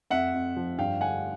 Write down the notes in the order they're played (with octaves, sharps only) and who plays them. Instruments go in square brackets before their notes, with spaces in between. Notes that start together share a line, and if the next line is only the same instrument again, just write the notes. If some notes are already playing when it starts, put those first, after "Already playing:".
[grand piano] F2 E5 F#5
F2
F3
G2 F5 G5
D3 F#5 G#5